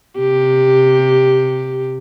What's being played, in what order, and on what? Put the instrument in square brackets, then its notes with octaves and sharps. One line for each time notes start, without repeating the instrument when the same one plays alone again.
[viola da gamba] C3 G4